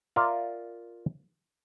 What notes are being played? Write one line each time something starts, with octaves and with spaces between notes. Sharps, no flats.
F4 A#4 D5 E5